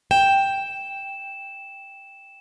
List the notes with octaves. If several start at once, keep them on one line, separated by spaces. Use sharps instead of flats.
G5 E7